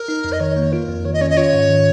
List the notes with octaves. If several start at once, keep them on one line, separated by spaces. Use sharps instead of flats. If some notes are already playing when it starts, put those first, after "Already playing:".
Already playing: A#4
D#4
F2
D#5
D#3 C#5
A#3
F4 A#4
F2
D#3 C#5
D#5
C#4 C#5
D#5
F4 C#5
G#2
D#3